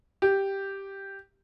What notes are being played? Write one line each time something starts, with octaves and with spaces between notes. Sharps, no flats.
G4